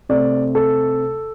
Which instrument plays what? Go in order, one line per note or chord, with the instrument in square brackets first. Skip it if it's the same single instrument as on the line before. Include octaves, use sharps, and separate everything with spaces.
[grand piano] C3 A3 C4 D5
A4